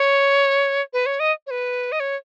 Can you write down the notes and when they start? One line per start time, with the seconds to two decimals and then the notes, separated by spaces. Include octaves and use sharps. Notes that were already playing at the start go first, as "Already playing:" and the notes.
Already playing: C#5
0.93 B4
1.06 C#5
1.20 D#5
1.47 C#5
1.51 B4
1.92 D#5
2.00 C#5